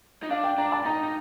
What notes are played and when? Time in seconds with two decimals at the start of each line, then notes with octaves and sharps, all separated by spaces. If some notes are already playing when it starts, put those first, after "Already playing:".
0.23 D#4
0.30 D4 F5
0.44 G5
0.58 D4 A#5
0.72 A5
0.85 D#4 A#5
1.03 D#4